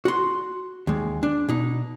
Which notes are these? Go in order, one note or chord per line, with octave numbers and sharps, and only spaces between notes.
F#4 C6
D#2 G#3
D4
B2 D#4